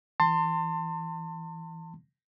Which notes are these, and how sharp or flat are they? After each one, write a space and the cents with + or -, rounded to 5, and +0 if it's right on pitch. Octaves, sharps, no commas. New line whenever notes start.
E3 +0 A5 +35 C6 +0